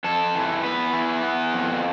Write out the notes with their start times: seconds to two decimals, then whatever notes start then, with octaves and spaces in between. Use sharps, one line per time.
0.04 F2 A4
0.35 E3
0.63 B3 B4
0.93 E3
1.23 B3
1.53 F2